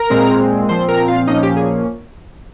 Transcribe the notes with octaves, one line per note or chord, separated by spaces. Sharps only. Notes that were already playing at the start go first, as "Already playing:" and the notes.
Already playing: A#4 A#5
A#2 G#3 C4
A#2 F3 C4 C5 C6
A#4 A#5
F4 F5
A#2 F3 A#3 C#4 D#4 D#5
G4
G#4